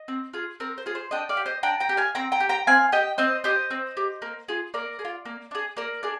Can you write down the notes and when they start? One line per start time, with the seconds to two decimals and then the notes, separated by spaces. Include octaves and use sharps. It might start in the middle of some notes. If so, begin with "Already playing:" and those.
Already playing: D#5
0.08 C4
0.33 F4 G#4
0.60 C4 A#4
0.78 C5
0.86 F4 G#4
0.95 C5
1.11 D4 D#5 G5
1.29 D5 F5
1.37 G4
1.46 C5 D#5
1.63 D4 G5 A#5
1.80 G5 A#5
1.89 G4
1.97 F5 G#5
2.15 C4 G5 A#5
2.32 G5 A#5
2.40 G4
2.49 G5 A#5
2.67 C4 F5 G#5
2.92 G4 D#5 G5
3.18 C4 C5 D#5
3.44 G4 C5 D#5
3.71 C4
3.97 G4
4.22 A#3
4.48 F4 G#4
4.74 A#3 A#4 D5
4.99 G#4
5.05 F4
5.25 A#3
5.51 D4 G#4
5.77 A#3 A#4 D5
6.03 D4 G#4